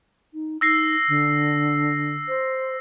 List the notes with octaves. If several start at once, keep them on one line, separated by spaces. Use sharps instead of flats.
D#4
D#4 E6 A#6 C7
D3
C5